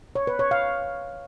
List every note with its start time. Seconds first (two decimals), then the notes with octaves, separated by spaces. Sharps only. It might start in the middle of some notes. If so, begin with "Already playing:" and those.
0.15 C#5
0.27 B4
0.39 C#5
0.51 F5